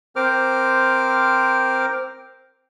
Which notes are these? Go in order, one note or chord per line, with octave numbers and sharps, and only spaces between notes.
C4 A#4 C5 D6 F6